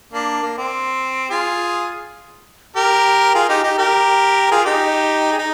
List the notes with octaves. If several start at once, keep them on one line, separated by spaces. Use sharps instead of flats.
A#3 D4
A#3
C4
F4 G#4
G4 A#4
F4 G#4
D#4 G4
D#4 G4
G4 A#4
F4 G#4
D#4 G4
G#4
D#4